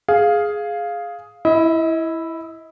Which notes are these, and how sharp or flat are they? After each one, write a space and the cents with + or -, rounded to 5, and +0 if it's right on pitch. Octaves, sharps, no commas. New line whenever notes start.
G#4 +5 F5 +0
E4 +0 D#5 +40